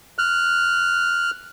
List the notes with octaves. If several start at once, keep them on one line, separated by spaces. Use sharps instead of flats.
F6 F#6